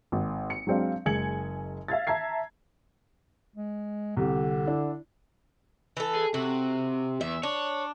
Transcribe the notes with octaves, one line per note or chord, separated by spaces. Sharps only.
G#1
C#7
F#3 G#3 C4 D4 F5
F#1 G#3 G#5 G#6 C#7 F#7
E5 F5 G#6 A6
E5 A5 A#5 G#6 C7
G#3
C2 D3 G4
D4 E4
E3 A4
G#4
C3 F#4
E2 E5
D4 C#5